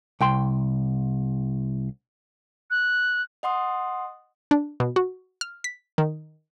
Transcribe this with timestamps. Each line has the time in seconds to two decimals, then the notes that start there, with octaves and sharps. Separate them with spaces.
0.21 C2 G5 C6
2.71 F#6
3.43 D#5 F#5 C6 D#6
4.51 D4
4.80 B2
4.96 F#4
5.41 F6
5.64 B6
5.98 D#3